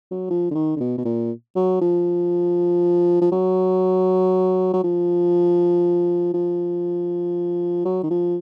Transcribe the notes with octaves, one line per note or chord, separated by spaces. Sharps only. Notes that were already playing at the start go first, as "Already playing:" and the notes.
F#3
F3
D3
D#3
D3
B2
B2
A#2
F#3
F3
F3
F#3
F#3
F3
F3
F#3
D#3
F3